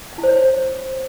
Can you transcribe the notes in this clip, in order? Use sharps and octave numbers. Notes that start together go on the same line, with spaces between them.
F5
E4
C5
C#5